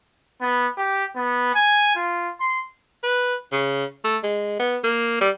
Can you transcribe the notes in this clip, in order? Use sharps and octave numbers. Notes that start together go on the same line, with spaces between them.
B3
G4
B3
G#5
F4
C6
B4
C#3
A3
G#3
B3
A#3
G3